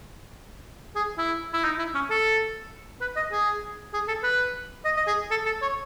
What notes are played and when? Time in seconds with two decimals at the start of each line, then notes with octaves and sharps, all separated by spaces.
0.95 G#4
1.18 E4
1.53 E4
1.64 D#4
1.79 E4
1.95 C#4
2.10 A4
3.01 B4
3.16 D#5
3.32 G#4
3.94 G#4
4.08 A4
4.23 B4
4.85 D#5
4.97 D#5
5.07 G#4
5.31 A4
5.45 A4
5.62 C#5